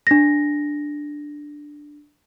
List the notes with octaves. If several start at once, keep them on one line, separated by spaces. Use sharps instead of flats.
D4 A#6